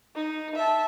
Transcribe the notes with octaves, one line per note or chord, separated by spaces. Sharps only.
D#4
E5 A5